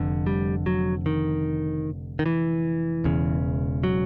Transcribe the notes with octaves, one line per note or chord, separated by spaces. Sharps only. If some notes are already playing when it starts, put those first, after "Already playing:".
Already playing: F1 F2 D3
G3
F#3
D#3
D#3
E3
E1 E2 C#3
F#3